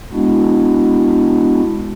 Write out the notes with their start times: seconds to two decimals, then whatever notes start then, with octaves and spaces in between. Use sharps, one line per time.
0.12 G#3 B3 D4 E4 F#4